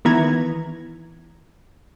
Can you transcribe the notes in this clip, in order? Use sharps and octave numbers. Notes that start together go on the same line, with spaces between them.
D#3 E3 B3 E4 A#5 G#6